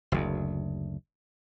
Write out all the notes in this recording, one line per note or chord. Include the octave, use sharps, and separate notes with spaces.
F#1 D2